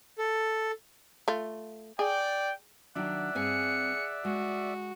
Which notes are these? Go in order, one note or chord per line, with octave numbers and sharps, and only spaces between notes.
A4
A3 F4
G#4 D5 G5
D#3 F#3 D4 D5 E5 F#5
G2 C4 G#4 G#5 C#7
G#3 F#4